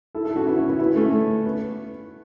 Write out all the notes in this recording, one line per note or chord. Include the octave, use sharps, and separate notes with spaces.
E4 A4
E4 A4
C#4 F#4
B3 E4
C#4 F#4
B3 E4
B3 E4
A3 C#4
A3
B3